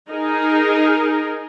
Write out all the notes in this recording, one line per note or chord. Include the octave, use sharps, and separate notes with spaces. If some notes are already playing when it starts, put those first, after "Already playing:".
D#4 G#4 A#4